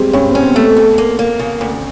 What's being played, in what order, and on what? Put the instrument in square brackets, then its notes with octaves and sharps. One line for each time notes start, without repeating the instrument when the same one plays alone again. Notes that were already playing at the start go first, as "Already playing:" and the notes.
Already playing: [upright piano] G3 G#3 C4
[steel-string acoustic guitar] G2 [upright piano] C#4
[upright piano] C4
[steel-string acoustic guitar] C#4
[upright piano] C4
B3
[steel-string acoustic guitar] A3 [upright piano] A#3
[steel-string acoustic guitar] D2 [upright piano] B3
[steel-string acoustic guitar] A#3
A#3
C#3
D2